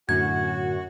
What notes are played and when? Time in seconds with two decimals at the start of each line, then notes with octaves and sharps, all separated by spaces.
0.09 F#2 A2 D3 F#4 G#6